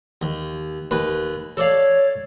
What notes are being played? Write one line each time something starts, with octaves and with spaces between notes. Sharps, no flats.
D#2
D#2 B4
A4 C#5 D5 F5